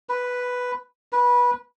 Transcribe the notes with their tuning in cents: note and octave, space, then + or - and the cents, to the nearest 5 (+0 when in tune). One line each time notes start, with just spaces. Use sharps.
B4 +0
B4 -20